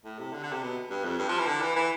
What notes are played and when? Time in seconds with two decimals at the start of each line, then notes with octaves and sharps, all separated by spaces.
0.05 A2
0.19 C3
0.33 D3
0.43 D3
0.52 C3
0.62 B2
0.90 G2
1.04 F2
1.18 G2
1.29 F3
1.39 E3
1.47 D3
1.61 E3
1.76 E3